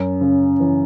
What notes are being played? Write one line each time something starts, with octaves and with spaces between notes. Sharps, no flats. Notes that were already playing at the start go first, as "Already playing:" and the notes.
Already playing: F#2
C#3
E3